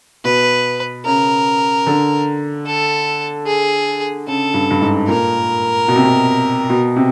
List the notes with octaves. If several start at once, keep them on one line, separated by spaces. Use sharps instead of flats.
B2 B4
C#3 A#4
D3
A4
G#4
C#3 A4
G2
G2
G#2
A#2 A#4
B2
C3
B2
B2
C3